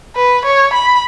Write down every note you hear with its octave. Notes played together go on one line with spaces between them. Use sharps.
B4
C#5
B5